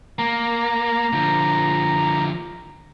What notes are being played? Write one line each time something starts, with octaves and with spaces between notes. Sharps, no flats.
A#3 A#5
D3 F3